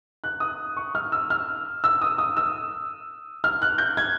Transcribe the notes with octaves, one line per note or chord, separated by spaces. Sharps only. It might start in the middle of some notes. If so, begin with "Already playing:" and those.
F#6
D#6
C#6
F6
E6
F6
E6
D#6
D#6
E6
F6
F#6
G6
G#6